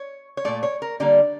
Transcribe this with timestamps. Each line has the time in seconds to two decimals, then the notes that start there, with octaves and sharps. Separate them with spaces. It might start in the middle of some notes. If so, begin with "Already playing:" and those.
Already playing: C#5
0.37 C#5
0.45 A#2 A3 D5
0.63 C#5
0.82 A#4
1.00 D3 G3 A#3 D5